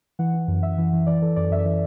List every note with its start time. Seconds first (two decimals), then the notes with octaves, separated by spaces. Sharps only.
0.19 E3 F#5
0.34 E3
0.48 F#2
0.62 F#2 E5
0.78 E3
0.93 E3
1.07 E3 D5
1.22 E3 A4
1.36 F#2 D5
1.51 F#2 E5
1.65 E3